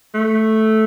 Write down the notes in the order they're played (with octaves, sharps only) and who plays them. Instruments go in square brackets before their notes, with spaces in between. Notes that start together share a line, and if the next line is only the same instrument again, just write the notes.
[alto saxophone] A3